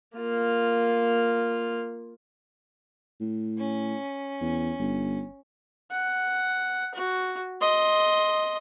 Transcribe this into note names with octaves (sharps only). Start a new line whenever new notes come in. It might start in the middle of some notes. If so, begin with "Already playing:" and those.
A#3 F4
A2
C#4
E2
G1
F#5
F#4
D#5 C6